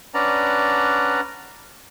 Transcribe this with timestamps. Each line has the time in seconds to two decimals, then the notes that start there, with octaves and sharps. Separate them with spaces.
0.14 C#4 D4 B4 D5 F#5 A#5